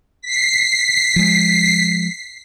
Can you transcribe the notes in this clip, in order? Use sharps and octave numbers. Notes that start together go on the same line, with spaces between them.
B6 C7
F3 G#3